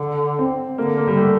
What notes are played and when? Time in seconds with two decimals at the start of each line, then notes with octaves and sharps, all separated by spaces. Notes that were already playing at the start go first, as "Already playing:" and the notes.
Already playing: D3
0.39 C4
0.78 D3 A#3
0.98 A#3
1.07 G3
1.17 A3